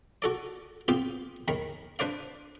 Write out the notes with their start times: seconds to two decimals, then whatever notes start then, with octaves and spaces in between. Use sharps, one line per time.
0.22 F#4 A4 D5
0.88 B3 C4 F4 G4
1.48 D#2 D#3 B5
1.99 D4 B4 C5 D5 F5